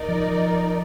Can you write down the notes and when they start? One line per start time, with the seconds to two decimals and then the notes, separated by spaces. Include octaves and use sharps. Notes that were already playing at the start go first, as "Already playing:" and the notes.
Already playing: D#4 A#4 D5
0.09 F3